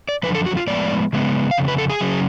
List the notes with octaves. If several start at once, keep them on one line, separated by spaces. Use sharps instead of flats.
D5
F#2 D3 F3 B4
A4
F#4
F4
A2 F3 G#3 B3 D5
C#3 G#3 B3
F5
F2 C#3
B4
A4
G#4
C#3 F#3 C#4